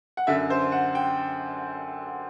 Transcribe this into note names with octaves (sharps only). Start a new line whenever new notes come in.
F#5
F#2 D3 E5
C5
F#5
G5